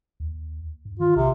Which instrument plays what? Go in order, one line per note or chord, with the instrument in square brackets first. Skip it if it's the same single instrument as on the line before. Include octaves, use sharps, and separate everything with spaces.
[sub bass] D#2
G2
[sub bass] D#3 [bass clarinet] F4
[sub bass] B1 [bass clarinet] C3